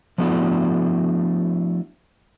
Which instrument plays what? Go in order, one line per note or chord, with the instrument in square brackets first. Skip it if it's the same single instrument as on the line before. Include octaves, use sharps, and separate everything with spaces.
[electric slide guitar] F3 A3 B3 D4 E4 F#4